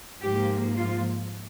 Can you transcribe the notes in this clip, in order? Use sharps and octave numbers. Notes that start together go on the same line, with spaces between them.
G#2 F3 A#3 G4
F4